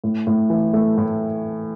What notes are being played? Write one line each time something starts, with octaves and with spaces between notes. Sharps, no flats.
A2
A2
E3
A3
A2